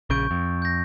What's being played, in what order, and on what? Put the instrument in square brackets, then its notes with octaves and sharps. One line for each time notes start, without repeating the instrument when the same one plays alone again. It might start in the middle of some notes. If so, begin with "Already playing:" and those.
[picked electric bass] A#1 C#3 [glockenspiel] C#6 G6 D7
[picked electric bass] F2
[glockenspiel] G6 A#6